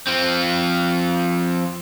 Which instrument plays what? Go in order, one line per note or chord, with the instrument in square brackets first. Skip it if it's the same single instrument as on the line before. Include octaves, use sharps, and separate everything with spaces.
[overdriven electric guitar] F3 C4